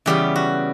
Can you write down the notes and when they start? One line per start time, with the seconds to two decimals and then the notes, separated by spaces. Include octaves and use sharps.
0.06 C#3 E3 G3 B3 G4
0.36 F#4